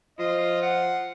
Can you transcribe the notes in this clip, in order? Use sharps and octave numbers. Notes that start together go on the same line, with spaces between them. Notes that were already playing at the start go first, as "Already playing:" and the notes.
F3 F4 D#5
F#5